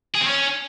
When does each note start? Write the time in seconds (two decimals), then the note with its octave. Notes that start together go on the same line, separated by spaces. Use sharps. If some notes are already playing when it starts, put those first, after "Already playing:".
0.15 G#4
0.21 C4
0.27 C#4